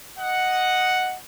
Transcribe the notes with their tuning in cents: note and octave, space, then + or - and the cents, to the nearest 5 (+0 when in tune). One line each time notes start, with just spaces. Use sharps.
D#5 +0 F#5 +0